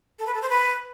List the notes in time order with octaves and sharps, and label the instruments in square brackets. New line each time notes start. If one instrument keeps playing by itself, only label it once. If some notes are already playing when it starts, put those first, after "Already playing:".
[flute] A4
B4
A4
C5
B4